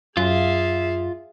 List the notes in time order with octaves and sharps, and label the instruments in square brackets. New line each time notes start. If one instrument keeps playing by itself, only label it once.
[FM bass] F#2 [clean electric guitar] F4 [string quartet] G#4 E5 F5